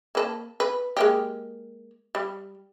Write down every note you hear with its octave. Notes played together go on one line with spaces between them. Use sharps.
A#3 B4 A5
B4
G#3 A#3 G4
G3